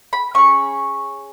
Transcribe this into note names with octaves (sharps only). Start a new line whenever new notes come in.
B5
C#4 G#4 C#6